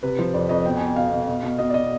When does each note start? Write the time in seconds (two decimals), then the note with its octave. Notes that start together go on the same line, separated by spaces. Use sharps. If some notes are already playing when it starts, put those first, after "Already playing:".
0.03 C3 B4
0.19 F3 C5
0.34 F2 D5
0.49 F2 D#5
0.66 B2 G5
0.77 B2 G#5
0.87 G5
0.96 B2 F5
1.12 B2
1.27 B2
1.43 B2
1.59 B2 D#5
1.70 D5
1.74 B2 D#5